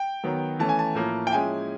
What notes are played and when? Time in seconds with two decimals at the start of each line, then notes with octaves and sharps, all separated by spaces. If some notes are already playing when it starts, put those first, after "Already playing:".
Already playing: G5
0.24 D#3 F#3 B3
0.59 E3 A3 C#4 A5
0.69 G#5
0.79 A5
0.95 A2 F3 A#3
1.27 G5
1.31 F3 G#3 C#4 E4 G#5